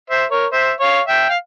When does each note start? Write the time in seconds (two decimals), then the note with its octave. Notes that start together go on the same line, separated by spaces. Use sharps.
0.10 C5 E5
0.31 A#4 C#5
0.52 C5 E5
0.80 C#5 F5
1.08 E5 G5
1.30 F5